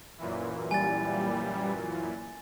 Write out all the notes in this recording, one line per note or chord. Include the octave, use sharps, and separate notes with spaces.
F#2 A#2 E3
G3 G#5 A6